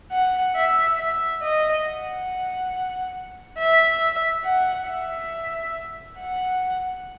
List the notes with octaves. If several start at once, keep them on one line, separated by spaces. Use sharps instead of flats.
F#5
E5
E5
D#5
F#5
E5
F#5
E5
F#5